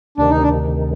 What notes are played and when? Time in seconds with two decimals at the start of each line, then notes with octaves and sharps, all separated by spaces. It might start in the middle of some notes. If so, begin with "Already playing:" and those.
0.18 D2 C3 D#3 D4
0.30 D#4
0.42 D4